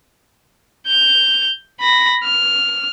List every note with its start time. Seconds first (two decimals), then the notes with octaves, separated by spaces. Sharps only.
0.88 G6 F7
1.80 B5 A#6
2.24 F6